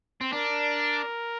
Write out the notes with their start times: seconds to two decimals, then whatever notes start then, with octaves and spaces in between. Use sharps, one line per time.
0.21 C4
0.32 D4 A#4